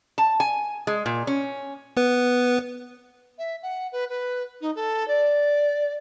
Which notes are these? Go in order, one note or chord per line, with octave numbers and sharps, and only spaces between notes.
A5
G#5
G#3
A#2
C#4
B3 B4
E5
F#5
B4
B4
D#4
A4
D5